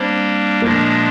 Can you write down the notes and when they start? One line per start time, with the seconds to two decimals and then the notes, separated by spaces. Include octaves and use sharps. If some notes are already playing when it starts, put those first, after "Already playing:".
Already playing: G3 A#3 C4 D4
0.62 A#2 F3 G#3 A#3 D4